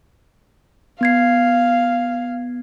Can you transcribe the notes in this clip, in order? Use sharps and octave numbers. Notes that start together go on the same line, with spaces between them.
B3 F5 G#6 C7